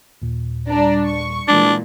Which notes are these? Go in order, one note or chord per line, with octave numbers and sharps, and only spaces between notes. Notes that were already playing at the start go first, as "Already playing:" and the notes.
D#2 A#2
G3 D4 A#5
C#6
A#2 E3 G#3 D4 A6